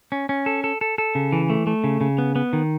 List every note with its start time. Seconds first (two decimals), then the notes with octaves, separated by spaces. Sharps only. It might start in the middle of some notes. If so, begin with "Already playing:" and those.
0.12 C#4
0.29 C#4
0.46 A4
0.64 A4
0.81 A4
0.98 A4
1.15 C#3
1.32 E3
1.50 A3
1.67 A3
1.84 C#3
2.01 C#3
2.18 B3
2.36 B3
2.53 D#3